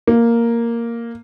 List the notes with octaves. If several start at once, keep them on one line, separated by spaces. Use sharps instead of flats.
A#3